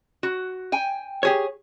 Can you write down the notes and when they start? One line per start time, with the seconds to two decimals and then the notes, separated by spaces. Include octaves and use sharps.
0.23 F#4
0.72 G5 G#5
1.23 G4 G#4 C#5